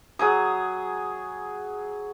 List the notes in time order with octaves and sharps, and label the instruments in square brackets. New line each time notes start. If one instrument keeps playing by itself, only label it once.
[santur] F#3 G#4 D#6